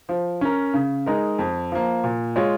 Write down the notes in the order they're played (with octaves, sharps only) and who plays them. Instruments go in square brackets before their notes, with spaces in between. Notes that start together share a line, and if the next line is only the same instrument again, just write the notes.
[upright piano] F3
C#4 A#4
C#3
G#3 D#4 A#4
F2
F3 A#3
A#2
G#3 F4 C#5